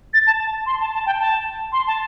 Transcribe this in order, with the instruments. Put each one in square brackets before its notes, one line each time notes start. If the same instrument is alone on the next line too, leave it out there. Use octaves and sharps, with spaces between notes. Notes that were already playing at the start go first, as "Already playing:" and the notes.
[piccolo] A6
A5
A5
C6
A5
A5
G5
A5
C6
A5